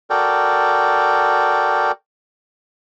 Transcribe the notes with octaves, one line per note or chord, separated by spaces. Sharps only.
F#4 A4 A#4 D5 G5